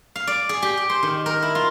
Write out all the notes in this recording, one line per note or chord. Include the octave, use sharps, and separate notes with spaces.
F5
D5
G#4
G4
G5
C5
D#3
A#4
E4
F4